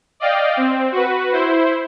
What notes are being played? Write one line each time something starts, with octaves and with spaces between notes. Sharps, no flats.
D5 D#5 F5 G5
C4
F#4 B4
E4 C5